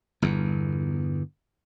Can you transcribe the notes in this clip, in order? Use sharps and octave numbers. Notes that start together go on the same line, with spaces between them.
G1 E2